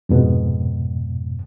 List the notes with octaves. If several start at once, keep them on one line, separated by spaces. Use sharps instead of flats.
F2 G#2 B2